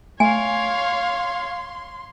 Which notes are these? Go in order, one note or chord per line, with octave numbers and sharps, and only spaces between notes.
A3 C#5 F5 G#5 C6